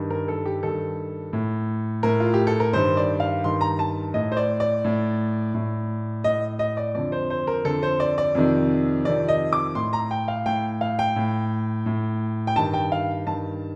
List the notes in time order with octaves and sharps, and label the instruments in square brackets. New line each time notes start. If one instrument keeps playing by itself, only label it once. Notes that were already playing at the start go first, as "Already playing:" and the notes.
Already playing: [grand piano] G2 D#3
A#4
A4
G4
G2 D#3 A4
A2
A2 A#4
F4
G4
A4
A#4
G2 D#3 C5
D5
F5
G2 D#3 C6
A#5
A5
A2 D#5
C5
D5
D5
A2
A2
A2 D#5
D#5
D5
F2 D3 D5
C5
C5
A#4
F2 D3 A4
C5
D5
D5
F2 C3 D#3
F2 C3 D#3 D5
D#5
D6
A2 C6
A#5
G5
F5
A2 G5
F5
G5
A2
A2
G5
G2 D#3 A5
G5
F5
G2 D#3 A5